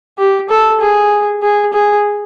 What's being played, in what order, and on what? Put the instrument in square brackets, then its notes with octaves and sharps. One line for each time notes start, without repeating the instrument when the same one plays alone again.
[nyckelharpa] G4
A4
G#4
G#4
G#4